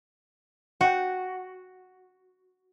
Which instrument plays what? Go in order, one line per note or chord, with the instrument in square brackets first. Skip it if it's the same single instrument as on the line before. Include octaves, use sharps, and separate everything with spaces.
[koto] F#4 [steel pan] F#5 G5